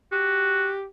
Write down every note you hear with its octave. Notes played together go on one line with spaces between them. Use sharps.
F#4 G4